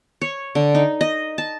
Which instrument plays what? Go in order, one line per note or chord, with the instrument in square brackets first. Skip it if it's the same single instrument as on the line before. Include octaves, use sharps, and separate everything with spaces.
[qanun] C#5
D3
D#4
D#5
A5